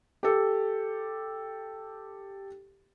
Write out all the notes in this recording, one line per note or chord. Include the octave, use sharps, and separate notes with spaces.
G4 A4